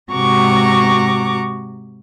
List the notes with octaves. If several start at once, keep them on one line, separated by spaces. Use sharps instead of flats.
G#2 C3 F#4 A#5 C#6 D6